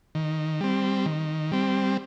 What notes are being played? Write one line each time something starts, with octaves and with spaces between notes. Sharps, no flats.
D#3
G3 C4
D#3
G3 C4